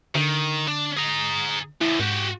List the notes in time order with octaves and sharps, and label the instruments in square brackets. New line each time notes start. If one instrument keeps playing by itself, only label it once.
[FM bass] D3 [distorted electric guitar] D#3
[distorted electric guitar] D4
G#4 A#5
[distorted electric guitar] E2 A2 [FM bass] E4
[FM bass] G#2 [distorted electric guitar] F#4 G4